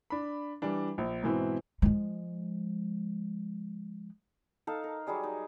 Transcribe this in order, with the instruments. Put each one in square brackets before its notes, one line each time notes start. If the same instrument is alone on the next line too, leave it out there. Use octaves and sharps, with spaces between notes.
[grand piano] D4 B5
E3 G3 D4
A#1
G#2 B2 E3 C4 E4
[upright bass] F3 G#3
[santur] D#4 A4 F5 A5
A#4
F#3 G3 G#4 D5
D#4